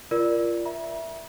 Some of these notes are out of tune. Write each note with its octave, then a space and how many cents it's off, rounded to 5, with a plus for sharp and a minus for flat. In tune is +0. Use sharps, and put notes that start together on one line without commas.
F4 -20 A#4 +15 D5 +0
E5 -5 A#5 +45